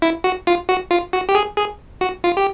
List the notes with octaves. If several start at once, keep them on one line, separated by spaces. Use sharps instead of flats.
E4
F#4
F4
F#4
F4
F#4
G4
G#4
G#4
F#4
F4
G4